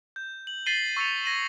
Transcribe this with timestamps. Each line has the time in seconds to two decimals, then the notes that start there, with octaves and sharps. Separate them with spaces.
0.16 G6
0.47 F#7
0.66 A6 B6 C7 D#7 F#7 G7
0.97 C#6 E6 A6 B6 C#7 F7
1.24 G#6 A#6 D#7 F#7